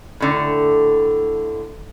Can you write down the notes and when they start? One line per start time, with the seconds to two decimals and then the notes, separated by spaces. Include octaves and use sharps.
0.20 A2 D3